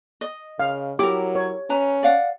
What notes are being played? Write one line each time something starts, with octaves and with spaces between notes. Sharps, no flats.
D#5
C#3 F5
F#3 E4 G4 A#4 D6
C#5
C#4 B4 A#5
D5 F5 F#5